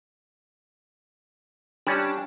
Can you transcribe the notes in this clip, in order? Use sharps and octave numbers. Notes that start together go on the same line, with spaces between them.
G3 C#4 D4